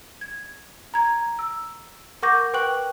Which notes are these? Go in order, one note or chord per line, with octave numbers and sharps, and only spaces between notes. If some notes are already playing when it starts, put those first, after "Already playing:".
G#6
A#5 G#6
E6
A#4 F#5 C#6 D6 G6 A#6
B4 G5 C#6 F#6 F#7